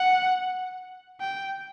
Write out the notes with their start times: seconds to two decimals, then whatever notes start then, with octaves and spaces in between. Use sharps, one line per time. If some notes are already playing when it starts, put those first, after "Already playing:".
Already playing: F#5
1.20 G5